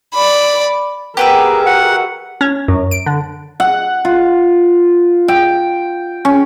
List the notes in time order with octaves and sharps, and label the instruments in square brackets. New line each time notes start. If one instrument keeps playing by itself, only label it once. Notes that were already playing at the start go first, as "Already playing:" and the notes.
[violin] D5 B5
[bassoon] B3 [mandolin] G4 B4 E5 [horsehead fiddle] G#4 A#4
[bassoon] F#4 [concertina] F#5
[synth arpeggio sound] C#4
F#2
D7
D3
[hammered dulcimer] F#5
F4
G5
C#4